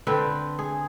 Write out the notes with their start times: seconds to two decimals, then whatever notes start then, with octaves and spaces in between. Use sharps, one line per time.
0.07 D3 C4 B4 G5
0.59 G#4